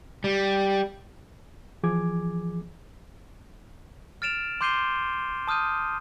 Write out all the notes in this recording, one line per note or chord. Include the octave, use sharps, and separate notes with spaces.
G3
E3 F3 G#4 D6 G#6
F6 A6 D7 E7 F7
C6 D6 G6 C7 D#7 G7
A5 D#6 F6 G6 D#7